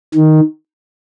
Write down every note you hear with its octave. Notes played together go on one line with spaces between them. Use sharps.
D#3